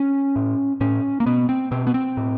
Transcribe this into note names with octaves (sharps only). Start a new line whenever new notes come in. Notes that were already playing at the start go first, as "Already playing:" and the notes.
Already playing: C#4
A2
A2 C#4
A#3
B2 B3
C4
B2 C4
B3
C4
A2